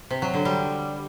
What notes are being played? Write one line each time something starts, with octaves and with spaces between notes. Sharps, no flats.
C3
F#3
D3
G3